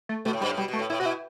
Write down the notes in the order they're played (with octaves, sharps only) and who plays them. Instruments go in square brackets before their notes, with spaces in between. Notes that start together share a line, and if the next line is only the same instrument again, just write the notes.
[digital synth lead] A3
[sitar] B2 [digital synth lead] A3
[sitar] A2
[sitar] G2 [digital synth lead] G3
[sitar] A2
[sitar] B2 [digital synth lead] G3
[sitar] B2
[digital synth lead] A3
[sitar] A2
[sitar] A2 [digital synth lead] E4
[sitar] B2 [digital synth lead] F#4
[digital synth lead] E4